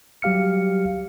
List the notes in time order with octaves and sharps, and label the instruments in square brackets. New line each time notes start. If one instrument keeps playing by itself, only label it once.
[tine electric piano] F#3 G3 G4 F5 F6 C#7